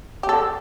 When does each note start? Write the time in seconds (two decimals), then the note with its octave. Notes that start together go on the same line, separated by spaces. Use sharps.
0.23 G4
0.29 A4